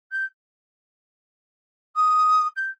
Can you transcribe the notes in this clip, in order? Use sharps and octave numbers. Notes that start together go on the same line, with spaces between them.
G6
D#6
G6